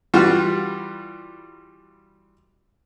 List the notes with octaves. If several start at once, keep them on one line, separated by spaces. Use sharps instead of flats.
E3 G3 F4 F#4